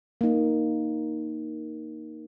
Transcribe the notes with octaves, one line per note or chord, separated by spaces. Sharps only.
A#3 D#4